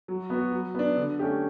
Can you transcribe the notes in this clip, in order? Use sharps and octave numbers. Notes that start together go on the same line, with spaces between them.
F#3
B3 F#4
F#3
B3 D4
D3
A3 C#4 G4